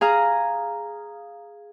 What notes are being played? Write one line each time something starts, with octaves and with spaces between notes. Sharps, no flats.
G#4 F5 A#5